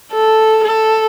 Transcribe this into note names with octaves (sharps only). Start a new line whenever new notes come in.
A4
A4